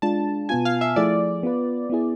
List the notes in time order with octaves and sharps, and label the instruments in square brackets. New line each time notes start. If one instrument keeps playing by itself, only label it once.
[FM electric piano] G#3 D4 F4 [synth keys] A5
[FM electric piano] B2 B3 F4 [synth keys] G#5
[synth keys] F5
E5
[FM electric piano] F3 A3 E4 G#4 [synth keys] D5
[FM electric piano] B3 F4 B4
B3 E4 G#4